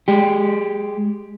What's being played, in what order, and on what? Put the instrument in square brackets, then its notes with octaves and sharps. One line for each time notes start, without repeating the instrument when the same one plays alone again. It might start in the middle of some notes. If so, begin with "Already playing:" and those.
[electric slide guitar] G#3 G4